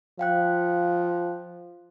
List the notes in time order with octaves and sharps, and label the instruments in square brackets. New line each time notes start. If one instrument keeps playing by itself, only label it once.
[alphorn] F3 [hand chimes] F5 G5 F#6